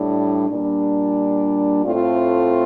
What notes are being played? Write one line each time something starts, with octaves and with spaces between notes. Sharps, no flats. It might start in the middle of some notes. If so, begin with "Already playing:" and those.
Already playing: A2 G3 D4
A#2 G3 D4
A2 A3 C4 F4